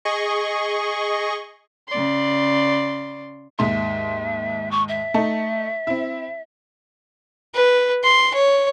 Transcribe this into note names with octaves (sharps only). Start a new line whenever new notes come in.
G#4 D#5 C#6
C#3 D5 C6
D#2 G#2 E5 C6
C#6
E5
A3 D#4 A5
C4 E4
B4
C6
C#5